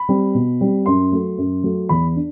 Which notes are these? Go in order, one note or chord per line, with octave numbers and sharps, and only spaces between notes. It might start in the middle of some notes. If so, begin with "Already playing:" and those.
Already playing: B5
G3 C4
B2
G3 C4
F#2 C6
F#3 A3
F#2
F#3 A3
E2 B5
D4